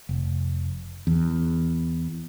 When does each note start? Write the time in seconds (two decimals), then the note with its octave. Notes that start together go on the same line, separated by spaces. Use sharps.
0.09 F1
1.07 E2